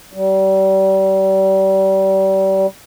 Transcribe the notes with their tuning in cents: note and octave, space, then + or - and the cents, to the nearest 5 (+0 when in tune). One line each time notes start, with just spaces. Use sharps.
G3 -30